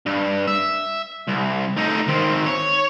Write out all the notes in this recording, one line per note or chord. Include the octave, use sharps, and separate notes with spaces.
G2
E5
C2
A3 D#4
D#3 C4
C#5